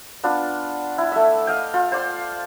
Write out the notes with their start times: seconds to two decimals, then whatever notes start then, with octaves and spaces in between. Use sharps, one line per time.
0.24 B3 D4 F4
0.98 E4
1.12 A3 E5
1.47 D#5 F5 G5
1.74 F4
1.92 C5 D5 C6